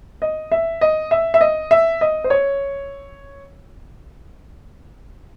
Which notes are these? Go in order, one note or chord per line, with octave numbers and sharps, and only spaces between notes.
D#5
E5
D#5
E5
E5
D#5
E5
D#5
C5
C#5